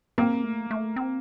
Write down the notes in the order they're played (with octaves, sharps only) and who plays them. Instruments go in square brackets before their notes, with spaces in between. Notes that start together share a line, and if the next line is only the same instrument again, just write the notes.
[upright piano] A#3 [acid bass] C4
[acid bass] A3
A3
C4